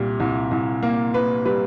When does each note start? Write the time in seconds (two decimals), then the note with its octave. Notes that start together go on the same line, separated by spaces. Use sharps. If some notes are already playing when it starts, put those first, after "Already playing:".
Already playing: C2 A#2 G3
0.20 C2
0.51 C2
0.83 A#3
1.14 A#3 B4
1.45 G3 B4